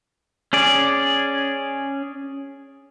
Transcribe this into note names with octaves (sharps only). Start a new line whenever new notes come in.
C#4 G#4 D5